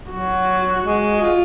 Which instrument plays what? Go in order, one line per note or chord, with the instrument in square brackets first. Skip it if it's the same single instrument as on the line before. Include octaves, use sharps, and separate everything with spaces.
[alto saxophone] F#3 [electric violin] F#4
[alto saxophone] G#3
F4